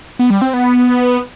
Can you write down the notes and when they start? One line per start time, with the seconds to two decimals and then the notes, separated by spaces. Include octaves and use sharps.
0.19 B3
0.30 G3
0.42 C4
0.54 B3